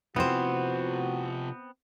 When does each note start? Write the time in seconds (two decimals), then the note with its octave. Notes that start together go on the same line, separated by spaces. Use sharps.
0.16 C3 F3 B3 C4 E4 F#4 C5